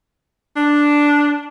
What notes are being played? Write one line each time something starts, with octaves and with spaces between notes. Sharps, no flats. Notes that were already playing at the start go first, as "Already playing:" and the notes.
D4